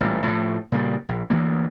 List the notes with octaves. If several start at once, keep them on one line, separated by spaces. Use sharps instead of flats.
A1 G2 A#2 G3
A2 F3
A#2 C#3 G3
A#1
D2 E3 G3 A#3